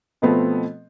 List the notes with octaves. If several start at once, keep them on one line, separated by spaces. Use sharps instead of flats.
B2 F3 A3 B3 C4